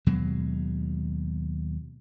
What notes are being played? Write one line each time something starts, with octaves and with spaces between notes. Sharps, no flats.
D#2 B2 F#3 G#3